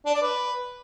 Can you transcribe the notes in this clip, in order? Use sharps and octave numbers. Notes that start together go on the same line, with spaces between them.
D4
D5
B4